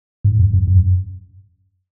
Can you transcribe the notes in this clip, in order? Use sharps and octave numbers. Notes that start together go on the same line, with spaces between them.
G#2
F#2
F#2
F#2